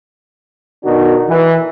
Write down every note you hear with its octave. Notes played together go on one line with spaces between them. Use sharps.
B2 D#3 D4 D#4 F#4
E3